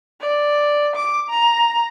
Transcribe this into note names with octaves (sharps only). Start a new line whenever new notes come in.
D5
D6
A#5